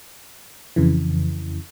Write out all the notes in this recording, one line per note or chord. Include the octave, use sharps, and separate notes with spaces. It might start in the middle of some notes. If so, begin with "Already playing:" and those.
F2 C#3 E3